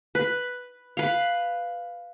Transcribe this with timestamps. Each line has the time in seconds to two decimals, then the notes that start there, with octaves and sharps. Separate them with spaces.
0.15 B4
0.97 B4 F5